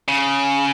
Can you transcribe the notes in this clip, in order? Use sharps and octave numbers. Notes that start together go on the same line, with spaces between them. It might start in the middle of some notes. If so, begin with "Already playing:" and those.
C#3